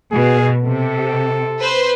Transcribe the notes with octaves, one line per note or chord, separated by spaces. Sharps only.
B2 G#4
C3 A4
B4 C5